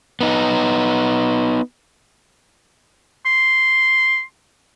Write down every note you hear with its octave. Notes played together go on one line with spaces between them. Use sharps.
B3 D#4
C6